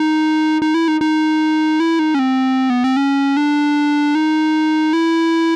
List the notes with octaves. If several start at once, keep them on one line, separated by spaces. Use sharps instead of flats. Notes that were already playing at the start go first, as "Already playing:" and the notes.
Already playing: D#4
D#4
E4
D#4
D#4
E4
D#4
C#4
C4
B3
C4
C#4
D4
D#4
E4